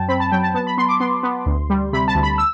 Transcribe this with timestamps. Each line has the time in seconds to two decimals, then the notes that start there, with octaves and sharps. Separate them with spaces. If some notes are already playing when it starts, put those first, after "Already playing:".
Already playing: F#2 F#3 G5 A5
0.08 C4 B5
0.20 A5
0.32 F#3 G5
0.43 A5
0.54 B3 A5
0.67 B5
0.78 B3 C6
0.89 D6
1.00 B3 C6
1.23 B3
1.46 D2
1.70 G3
1.93 C3 B5
2.08 A5
2.15 D2
2.23 B5
2.38 E6